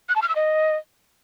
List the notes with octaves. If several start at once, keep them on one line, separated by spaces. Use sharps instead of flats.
F#6
A5
F6
E6
D#5